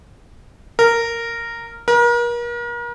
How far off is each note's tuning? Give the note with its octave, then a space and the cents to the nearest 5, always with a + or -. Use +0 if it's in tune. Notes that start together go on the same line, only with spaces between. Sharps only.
A#4 -10
A#4 +40